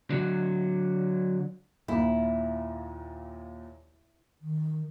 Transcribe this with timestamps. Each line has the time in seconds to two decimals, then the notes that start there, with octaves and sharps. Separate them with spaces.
0.10 D3 F#3
1.88 D#2 A#2 E4
4.41 D#3